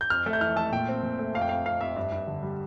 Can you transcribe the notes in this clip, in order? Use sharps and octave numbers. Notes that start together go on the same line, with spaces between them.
G6
F2 F6
A3
G6
E3 F6
A3 A5
A#2 G5
C4
A#2
A3
F2 F5
G5
F2 F5
F2 F5
F2 E5
G2 E5
G2
D3
G3